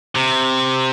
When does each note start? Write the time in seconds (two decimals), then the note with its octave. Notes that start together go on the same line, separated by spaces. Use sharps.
0.15 C3